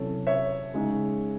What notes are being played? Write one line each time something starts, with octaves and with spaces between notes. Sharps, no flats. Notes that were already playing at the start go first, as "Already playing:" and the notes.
Already playing: C3 F#3 C#4 E4 A4 C#5
C#5 E5
C#3 G#3 D#4